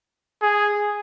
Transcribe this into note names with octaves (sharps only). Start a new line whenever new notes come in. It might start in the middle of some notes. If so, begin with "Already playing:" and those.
G#4